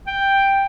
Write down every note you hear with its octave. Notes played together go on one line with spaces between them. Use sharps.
G5